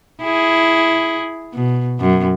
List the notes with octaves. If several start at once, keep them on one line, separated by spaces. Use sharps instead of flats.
E4 G#4
B2
F#2